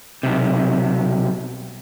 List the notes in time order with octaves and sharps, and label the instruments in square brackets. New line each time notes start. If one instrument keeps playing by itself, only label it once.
[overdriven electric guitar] B1 C3